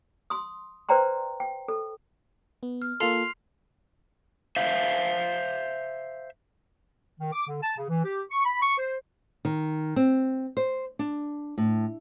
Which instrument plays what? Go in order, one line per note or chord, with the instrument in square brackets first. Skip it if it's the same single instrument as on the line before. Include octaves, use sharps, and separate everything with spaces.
[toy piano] C6 D#6
B4 C5 D5 G5 A#5 C6
G5
A4
[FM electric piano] B3
[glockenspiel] F6
[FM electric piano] A#3 F4 A4 [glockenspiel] C6 C7 F7
[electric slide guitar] C5 E5 F5
[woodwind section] D#3
D6
D3
A5
C#3
E3
G4
C#6
B5
C#6
C5
[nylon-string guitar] D#3
C4
C5
D4
A2